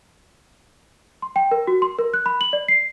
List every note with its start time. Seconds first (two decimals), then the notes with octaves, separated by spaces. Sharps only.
1.22 C6
1.36 G5
1.51 A#4
1.67 F#4
1.82 C6
1.99 A#4
2.14 F#6
2.26 B5
2.41 F#7
2.53 D5
2.68 C7